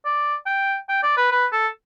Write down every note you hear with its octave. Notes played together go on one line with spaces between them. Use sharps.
D5
G5
G5
D5
B4
B4
A4